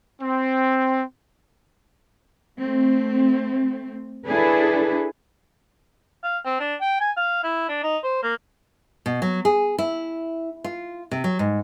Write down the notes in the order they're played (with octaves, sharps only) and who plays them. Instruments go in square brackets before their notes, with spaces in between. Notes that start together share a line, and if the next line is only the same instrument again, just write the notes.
[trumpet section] C4
[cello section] A3 C4
D4 E4 G#4 A4 B4
[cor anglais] F5
C4
D4
G5
G#5
F5
E4
D4
D#4
C5
A#3
[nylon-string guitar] B2
F#3
G#4
E4
F4
C3
F#3
G#2